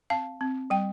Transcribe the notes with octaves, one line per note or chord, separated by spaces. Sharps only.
C4 F5 A5
C4
G3 G5